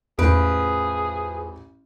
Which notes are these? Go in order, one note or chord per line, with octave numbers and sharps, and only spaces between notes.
A1 E2 F3 G#4 B4 D7